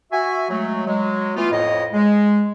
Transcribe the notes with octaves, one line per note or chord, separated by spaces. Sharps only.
F#4 E5 G#5
F#3 G#3 A3
F#3 G#3
E3 A3 B3 F4
F2 A2 C#5 D#5
G#3